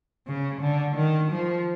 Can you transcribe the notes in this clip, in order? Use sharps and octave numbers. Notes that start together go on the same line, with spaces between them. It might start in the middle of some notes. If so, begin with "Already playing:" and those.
C#3
D3
D#3
F3